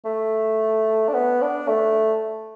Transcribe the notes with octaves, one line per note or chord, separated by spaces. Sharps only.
A3
D4
B3
D4
A3